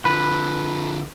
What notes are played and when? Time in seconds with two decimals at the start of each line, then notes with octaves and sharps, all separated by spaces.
0.05 D3 F3 B4 B5